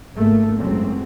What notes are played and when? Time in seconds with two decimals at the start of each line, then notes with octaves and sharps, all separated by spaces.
0.15 G#1 C#2 A3 A#3
0.58 F#1 C#2 F#2 F#3 A3 C4